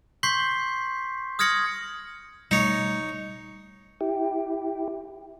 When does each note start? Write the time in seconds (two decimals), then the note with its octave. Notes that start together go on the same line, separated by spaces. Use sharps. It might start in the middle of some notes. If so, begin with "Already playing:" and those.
0.23 C6 C#6 G6 B6 C7
1.39 D#6 F6 G#6 A#6 C#7 F#7
2.51 B2 G3 A3 D#4 C#5
4.01 E4 G4